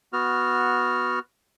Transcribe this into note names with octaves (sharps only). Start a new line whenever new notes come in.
B3 F#4 F6